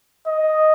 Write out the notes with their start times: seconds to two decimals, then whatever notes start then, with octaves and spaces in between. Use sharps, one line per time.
0.27 D#5